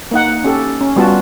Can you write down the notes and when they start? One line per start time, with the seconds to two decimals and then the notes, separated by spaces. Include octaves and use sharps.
0.11 A#3 D#4 F#5
0.44 C#4 G4 A4
0.81 C#4
0.96 G3 B3 F4 F#4 A5